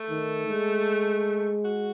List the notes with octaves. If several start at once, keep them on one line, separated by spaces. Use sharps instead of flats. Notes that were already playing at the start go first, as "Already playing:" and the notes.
Already playing: A3
D#3
G#3
F#4